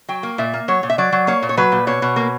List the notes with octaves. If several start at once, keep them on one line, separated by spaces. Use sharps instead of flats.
F#3 G5
A#3
A#2 E5
A#3
F#3 C#5
A#2
E5
F#3 D5
F#3
A#3 C#5
A#2
C#5
F#3 B4
A#2
B2 C#5
B2
A#3